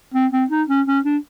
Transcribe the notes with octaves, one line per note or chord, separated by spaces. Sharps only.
C4
C4
D#4
C#4
C#4
D4